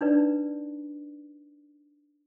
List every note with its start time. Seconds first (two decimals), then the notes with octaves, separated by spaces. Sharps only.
0.01 D4 D#4 B4 D5